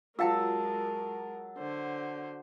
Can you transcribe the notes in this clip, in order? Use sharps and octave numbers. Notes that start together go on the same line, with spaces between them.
F#3 G#3 F4 A#4 F5 G5 A5 E6
D3 C5